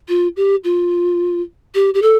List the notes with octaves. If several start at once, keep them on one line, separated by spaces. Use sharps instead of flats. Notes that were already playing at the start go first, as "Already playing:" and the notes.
F4
G4
F4
G4
G4
A4